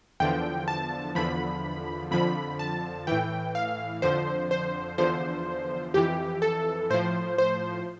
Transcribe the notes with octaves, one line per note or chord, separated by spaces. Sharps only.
E2 D3 F3 G5
A5
E2 D3 F3 B5
F2 D3 F3 B5
A5
A2 E3 G5
F5
F2 D3 F3 C5
C5
E2 D3 F3 C5
F2 E3 G4
A4
A2 F3 C5
C5